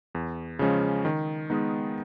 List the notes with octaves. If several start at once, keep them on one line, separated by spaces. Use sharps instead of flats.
E2
C#3 F3 G#3 C#4
D#3
G#3 B3 D#4